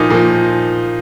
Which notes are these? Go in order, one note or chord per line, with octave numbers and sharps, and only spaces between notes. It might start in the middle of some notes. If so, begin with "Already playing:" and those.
Already playing: A#2 F3 D#4
A#2 F3